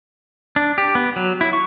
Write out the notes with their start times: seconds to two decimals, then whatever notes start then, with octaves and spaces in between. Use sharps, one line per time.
0.56 D4
0.78 G4
0.95 B3
1.16 F#3
1.41 E4
1.53 C#6